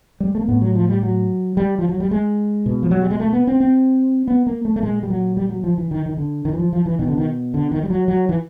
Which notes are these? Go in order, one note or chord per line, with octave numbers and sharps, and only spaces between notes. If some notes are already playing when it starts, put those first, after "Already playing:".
G3
G#3
A3
A#3
A2 B3
F#3
F3
G3
F#3
G3
F3
F#3
G3
G#3
B2
F3
F#3
G3
G#3
A3
B3
C4
C4
B3
A#3
A3
A3
A#2 G#3
G3
F#3
G3
F#3
F3
E3
D#3
D#3
D3
D#3
E3
F3
F3
E3
B2 D#3
D3
D#3
D3
D#3
G3
F#3
F#3
E3